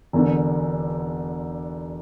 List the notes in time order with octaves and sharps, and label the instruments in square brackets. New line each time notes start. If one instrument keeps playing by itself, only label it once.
[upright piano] E1 E2 D3